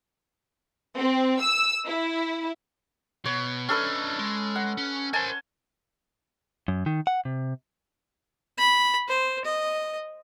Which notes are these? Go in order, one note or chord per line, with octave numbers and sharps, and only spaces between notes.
C4
E6
E4
B2 C#5
C#4 D4 A4 B4 D#5
G#3
F#5
C#4
A#4 C5 G#5 A5
F#2
D#3
F#5
C3
B5
C5
D#5